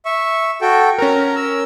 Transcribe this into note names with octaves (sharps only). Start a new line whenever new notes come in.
E5 C#6
F#4 A4 G5
C#4 A#4 A#5
E6